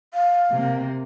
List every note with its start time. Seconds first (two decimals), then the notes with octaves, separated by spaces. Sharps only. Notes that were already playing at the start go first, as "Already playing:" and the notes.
0.14 F5
0.51 C3 A#3